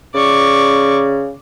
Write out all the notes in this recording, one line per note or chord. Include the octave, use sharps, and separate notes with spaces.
C#3 D5 C#6